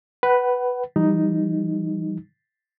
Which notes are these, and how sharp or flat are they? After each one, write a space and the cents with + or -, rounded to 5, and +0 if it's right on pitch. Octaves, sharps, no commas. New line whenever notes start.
B4 +0 F#5 +25
E3 +40 G3 +0 D#4 +0